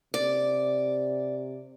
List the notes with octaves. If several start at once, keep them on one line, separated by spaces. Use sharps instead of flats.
C3 D5